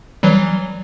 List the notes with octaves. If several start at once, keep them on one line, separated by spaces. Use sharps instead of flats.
E3 F#3 G3